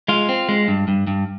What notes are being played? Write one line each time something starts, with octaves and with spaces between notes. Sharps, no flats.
G#3 F4
C4
G#3
G2
G2
G2